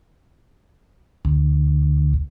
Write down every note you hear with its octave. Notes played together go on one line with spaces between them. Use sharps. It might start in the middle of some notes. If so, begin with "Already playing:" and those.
D2